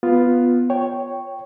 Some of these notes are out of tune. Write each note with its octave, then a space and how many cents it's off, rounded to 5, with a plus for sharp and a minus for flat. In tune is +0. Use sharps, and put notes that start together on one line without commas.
B3 +0 F4 +0
C#5 +0 G5 -5